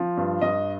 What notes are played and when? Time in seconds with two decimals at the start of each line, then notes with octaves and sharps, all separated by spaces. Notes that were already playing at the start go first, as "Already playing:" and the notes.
Already playing: F3
0.17 G2
0.41 G2 D#5